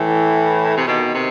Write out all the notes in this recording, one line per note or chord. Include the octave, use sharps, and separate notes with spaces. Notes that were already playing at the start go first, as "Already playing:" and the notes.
Already playing: A2 E3
C3
B2 D#3
C3